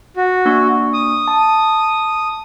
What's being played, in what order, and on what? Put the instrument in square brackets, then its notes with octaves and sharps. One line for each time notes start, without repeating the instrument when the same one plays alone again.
[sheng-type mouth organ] F#4
[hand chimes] A#3 D4 C#6
[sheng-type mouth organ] D#6
[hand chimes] A5